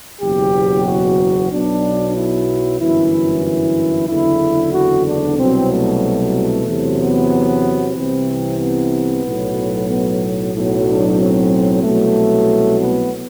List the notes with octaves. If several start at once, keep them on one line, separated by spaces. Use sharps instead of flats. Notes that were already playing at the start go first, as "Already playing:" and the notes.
F#1 E2 B2 F#3 G4
F#4
B1 B2 F#3 D4
E4
G1 F#2 E3 E4
E4
F#1 E2 D3 E4
F#4
D4
C2 B2 F#3 C4
A3
E2 C3 F#3
B3
C2 C3 E3 C4
B3
B1 A2 F#3
B3
B1 A2 F#3
D4
C4
C2 B2 F#3 A3
B3